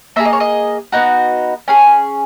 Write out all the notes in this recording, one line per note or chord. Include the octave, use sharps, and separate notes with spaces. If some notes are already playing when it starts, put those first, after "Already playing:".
A#3 D#4 G#4 E5
D#5
C#5
D#5
B3 D#4 F#4
C#4 G#4 G#5